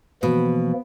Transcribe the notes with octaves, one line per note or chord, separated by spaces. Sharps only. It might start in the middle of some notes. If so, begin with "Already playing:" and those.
B2 E3 F3 A#3 B3